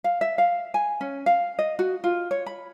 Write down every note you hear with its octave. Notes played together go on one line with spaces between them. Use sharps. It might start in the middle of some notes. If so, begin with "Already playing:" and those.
F5
E5
F5
G#5
C#4
F5
D#5
F#4
F4
C#5
B5